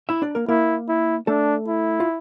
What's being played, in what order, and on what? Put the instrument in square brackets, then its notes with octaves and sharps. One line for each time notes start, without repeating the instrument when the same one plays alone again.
[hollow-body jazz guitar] E4 E5
D4 D5
A#3 A#4
[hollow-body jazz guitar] A#3 A#4 [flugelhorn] E4
[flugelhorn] E4
[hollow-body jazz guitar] A3 A4 [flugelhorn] D4
[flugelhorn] E4
[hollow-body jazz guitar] F4